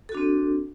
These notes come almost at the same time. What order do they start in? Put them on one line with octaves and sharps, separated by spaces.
A4 F#4 D4 C4